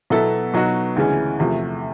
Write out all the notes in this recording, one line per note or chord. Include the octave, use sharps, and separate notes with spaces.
B2 F#3 B3 E4 A4
B2 F#3 B3 D#4 F#4
D2 C#3 E3 G#3 C#4
E2 C3 F3 A3